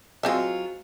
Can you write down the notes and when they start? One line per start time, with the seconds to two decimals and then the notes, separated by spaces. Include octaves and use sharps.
0.23 F#3 G#3 C4 F4 E5